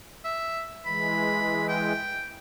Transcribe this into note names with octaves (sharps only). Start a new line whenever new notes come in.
E5
E3 G#3 B5
G5